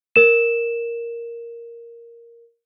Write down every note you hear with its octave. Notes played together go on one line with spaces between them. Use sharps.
A#4 E7